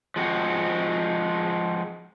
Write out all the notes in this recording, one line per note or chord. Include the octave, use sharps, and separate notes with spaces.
F3 G#3 C4 F#4